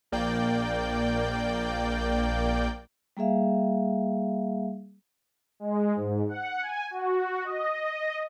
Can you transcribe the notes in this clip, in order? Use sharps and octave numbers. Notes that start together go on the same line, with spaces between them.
A#1 A#3 D5 G5 G6
G3 A#3 G#4 E5 F5
G#3
G#2
F#5
G#5
F#4
D#5